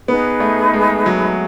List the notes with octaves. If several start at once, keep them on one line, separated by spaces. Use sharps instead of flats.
B3 D#4 G#4 B4
A3
G#3
F#3